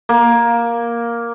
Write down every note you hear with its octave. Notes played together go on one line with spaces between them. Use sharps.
A#3